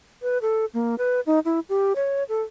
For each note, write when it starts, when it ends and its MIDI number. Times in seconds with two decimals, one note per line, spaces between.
0.22 0.38 71
0.42 0.65 69
0.74 0.95 58
0.98 1.20 71
1.26 1.39 63
1.45 1.60 64
1.69 1.93 67
1.96 2.24 73
2.29 2.41 69